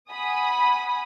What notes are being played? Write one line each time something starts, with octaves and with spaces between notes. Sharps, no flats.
F#5 G#5 B5 D#6